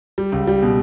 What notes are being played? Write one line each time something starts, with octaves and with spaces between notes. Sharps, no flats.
G3
C#2
G3
B2